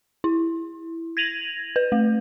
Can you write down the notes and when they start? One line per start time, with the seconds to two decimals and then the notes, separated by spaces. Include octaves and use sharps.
0.24 E4
1.17 G#6 A#6 D#7 F7 F#7
1.76 B4
1.92 A3